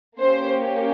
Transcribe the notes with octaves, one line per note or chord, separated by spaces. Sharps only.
A#3 C#4 G4 C5